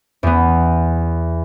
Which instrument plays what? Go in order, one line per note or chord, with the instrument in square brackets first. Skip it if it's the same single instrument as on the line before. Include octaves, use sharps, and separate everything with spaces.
[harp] E2 B3